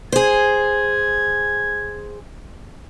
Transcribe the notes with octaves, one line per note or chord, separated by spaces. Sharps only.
G#4 C5 G#6